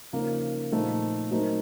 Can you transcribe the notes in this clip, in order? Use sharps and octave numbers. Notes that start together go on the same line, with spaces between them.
C#3 F3 A#3 D#4 A#4
A#2 F3 A3 D#4 A4
F#3 A3 C4 D#4 A#4